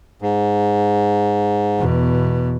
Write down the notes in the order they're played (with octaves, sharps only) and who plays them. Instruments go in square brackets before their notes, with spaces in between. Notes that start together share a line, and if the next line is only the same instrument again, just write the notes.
[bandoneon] G#2
[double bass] E2 B2